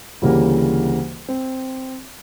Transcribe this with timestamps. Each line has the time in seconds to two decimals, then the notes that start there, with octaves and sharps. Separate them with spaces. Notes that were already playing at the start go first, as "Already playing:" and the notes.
0.22 D2 C#3 E3 G3 A#3
1.28 C4